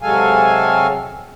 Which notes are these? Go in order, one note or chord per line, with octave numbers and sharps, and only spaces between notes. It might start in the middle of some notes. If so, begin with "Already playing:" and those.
C3 F#3 G#3 A4 F5 G#5